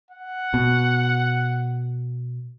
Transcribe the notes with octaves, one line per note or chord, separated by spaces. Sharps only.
F#5
B2